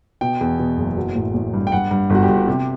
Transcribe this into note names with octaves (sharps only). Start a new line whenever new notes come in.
B2 G5
E2
B2
F#1
F#3
A1
A1
G2
G5
G2 F#5
G2
G1 F#4
G4
G1
C3